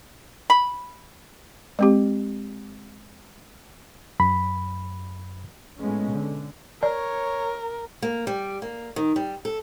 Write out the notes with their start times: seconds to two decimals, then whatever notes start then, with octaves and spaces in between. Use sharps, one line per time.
0.50 B5
1.79 G#3 C4 G4
4.20 F#2 B5
5.78 A2 G#3 B3 C#4
6.11 D3
6.83 A#4 C#5 D5
8.02 A#3
8.27 G3
8.62 A#3
8.96 D#3
9.16 G3
9.45 A4